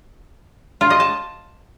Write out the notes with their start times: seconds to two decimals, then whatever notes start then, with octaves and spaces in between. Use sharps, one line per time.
0.81 F4
0.90 D#5
1.00 A5